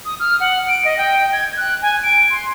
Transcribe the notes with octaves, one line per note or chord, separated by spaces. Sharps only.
D#6
F6
F#5
D7
D#5
G5
G#6
F#6
G#5
D7
C6